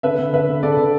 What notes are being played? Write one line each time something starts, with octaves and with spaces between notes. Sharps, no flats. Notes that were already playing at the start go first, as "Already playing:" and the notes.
D3 B4 E5
D3
D3 B4 E5
D3
D3 A4 D5
D3